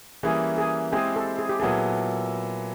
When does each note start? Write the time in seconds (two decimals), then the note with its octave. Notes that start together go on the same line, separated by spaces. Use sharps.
0.23 E3 G3 A#3 C#4 E4 G#4
0.58 G#4
0.92 G#3 C4 E4 G4 G#4
1.16 A4
1.39 G#4
1.49 G4
1.59 A#2 F#3 B3 E4 G#4 A4